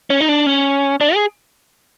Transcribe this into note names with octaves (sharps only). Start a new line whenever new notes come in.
C#4
D#4
D4
C#4
D4
G#4